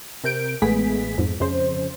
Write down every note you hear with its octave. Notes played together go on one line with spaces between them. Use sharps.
C3 A#4 G6 D7
A1 G#3 A3 B3 G#4 B6
F2 G#2
F2 C#3 C5